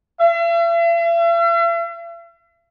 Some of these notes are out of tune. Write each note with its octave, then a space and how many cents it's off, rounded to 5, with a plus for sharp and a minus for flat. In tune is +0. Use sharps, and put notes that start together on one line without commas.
E5 +45